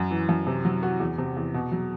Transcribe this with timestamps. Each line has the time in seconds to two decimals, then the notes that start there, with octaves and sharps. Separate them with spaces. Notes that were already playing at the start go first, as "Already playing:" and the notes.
Already playing: F#2
0.11 E3
0.29 F#2
0.47 C3
0.65 F#3
0.83 F#4
1.00 E2
1.18 C3
1.36 E2
1.54 B2
1.72 F#3